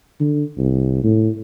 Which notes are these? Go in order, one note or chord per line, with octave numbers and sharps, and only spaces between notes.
D3
C2
A2